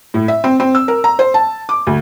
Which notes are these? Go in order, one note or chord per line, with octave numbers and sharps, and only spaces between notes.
A2
E5
C4
C4
E6
A#4
A#5
C5
A5
D6
D2